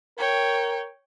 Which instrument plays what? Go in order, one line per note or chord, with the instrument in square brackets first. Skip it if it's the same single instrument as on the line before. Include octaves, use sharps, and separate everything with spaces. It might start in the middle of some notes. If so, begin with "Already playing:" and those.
[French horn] A#4 [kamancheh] C#5 G5